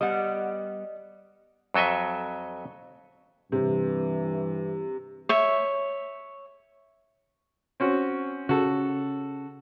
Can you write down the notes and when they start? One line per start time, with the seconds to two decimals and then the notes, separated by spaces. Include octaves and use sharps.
0.01 G3 B3 D#5 F#5
1.74 F2 F#3 A4 D#5 E5
3.52 G2 C3 E3
5.29 C#5 E5
7.80 C4 C#4 F#4
8.49 C#3 F#4 A4